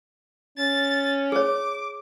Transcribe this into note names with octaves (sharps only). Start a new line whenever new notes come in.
C#4 A6
G#4 C#5 D6